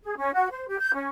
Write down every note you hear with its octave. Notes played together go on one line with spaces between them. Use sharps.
G#4
C#4
F#4
C5
G4
G6
C#4